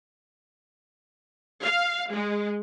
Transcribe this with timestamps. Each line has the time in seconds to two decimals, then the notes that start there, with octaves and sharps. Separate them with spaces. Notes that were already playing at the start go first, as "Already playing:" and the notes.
1.64 F5
2.12 G#3